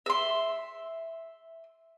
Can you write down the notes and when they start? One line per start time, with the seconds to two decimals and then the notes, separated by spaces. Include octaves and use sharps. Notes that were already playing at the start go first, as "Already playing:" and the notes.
0.06 E5 C6